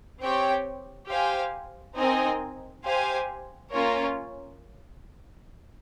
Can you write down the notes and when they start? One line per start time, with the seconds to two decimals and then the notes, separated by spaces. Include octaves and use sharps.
0.20 C4 G4 C#5 G5
1.09 G4 C5 F5 G#5
1.96 C4 D#4 A#4 D#5 G#5
2.84 G4 C5 F5 G#5
3.72 A#3 C#4 F4 A#4 C#5